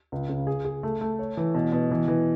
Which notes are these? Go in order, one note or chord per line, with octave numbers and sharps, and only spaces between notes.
C#2
C#3
G#4
G#4
A3
A3
C#5
E3
B2
B2
E3
E3